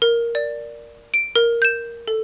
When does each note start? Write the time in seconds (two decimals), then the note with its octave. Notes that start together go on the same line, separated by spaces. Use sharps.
0.02 A#4
0.35 D5
1.14 D7
1.36 A#4
1.62 G6 E7
2.08 A4